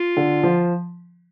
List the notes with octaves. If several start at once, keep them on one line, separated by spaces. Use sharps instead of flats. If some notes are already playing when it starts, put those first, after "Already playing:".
Already playing: F4
D3
F3